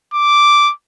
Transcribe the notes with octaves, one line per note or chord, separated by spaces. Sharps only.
D6